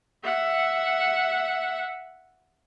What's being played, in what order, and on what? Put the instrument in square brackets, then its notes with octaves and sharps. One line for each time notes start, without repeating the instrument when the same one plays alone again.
[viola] E5 F#5